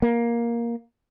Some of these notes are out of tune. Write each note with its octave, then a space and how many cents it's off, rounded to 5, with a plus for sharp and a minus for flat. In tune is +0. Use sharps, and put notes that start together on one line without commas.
A#3 +10